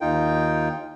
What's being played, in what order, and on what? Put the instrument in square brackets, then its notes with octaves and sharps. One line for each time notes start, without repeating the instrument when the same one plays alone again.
[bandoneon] D#2 D#4 F4 G5